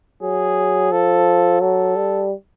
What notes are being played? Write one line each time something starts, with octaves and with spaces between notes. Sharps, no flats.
F#3 G#4
F3 A4
F#3 A4
G3